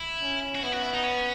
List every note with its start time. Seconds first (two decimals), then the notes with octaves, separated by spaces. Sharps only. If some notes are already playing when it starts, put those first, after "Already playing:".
Already playing: E4
0.22 C#4
0.55 F#4
0.63 B3 E4
0.72 F#4
0.82 E4
0.94 D#4
1.03 C#4